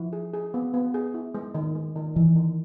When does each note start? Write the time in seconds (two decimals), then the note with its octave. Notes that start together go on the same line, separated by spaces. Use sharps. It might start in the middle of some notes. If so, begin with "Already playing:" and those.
Already playing: F3 E4
0.13 G#4
0.34 G#4
0.54 B3
0.74 B3
0.94 G#4
1.14 E4
1.35 G#3
1.55 D#3
1.75 G#3
1.96 D#3
2.16 D#3 E3
2.36 D#3